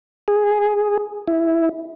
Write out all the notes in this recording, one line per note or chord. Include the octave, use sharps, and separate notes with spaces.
G#4
E4